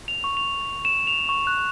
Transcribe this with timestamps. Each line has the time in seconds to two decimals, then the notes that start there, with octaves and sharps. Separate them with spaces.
0.08 F7
0.24 C#6
0.37 F7
0.85 E7
1.07 F7
1.29 C#6
1.47 F#6